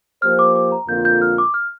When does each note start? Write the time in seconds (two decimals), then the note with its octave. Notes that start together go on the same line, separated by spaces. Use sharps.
0.22 F3 A#3 G4 C5 F6
0.39 D6
0.56 D6
0.72 A#5
0.88 F2 D3 A#3 F4 G6
1.05 G6
1.22 F6
1.38 D6
1.54 F6